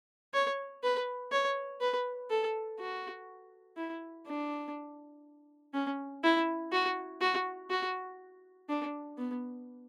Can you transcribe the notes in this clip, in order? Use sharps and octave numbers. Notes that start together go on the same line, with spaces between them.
C#5
B4
C#5
B4
A4
F#4
E4
D4
C#4
E4
F#4
F#4
F#4
D4
B3